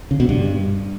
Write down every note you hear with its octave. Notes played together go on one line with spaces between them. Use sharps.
C#3
B2
G2